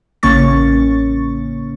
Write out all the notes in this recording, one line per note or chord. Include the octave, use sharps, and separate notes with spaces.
A1 C#3 A#3 C#4 C#6 A6